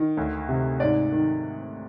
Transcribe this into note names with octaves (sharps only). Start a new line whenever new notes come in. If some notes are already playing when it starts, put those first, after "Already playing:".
Already playing: D#3
D2
C3
G#2 D5
D#3